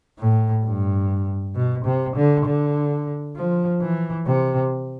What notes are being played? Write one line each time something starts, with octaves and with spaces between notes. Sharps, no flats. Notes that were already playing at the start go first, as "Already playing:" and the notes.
A2
G2
B2
C3
D3
D3
F3
E3
C3